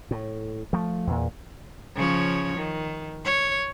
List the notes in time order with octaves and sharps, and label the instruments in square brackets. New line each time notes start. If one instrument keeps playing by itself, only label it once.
[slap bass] A2
F3 A3
E2 A#2
[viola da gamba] C#3 F3 C#5
D#3
C#5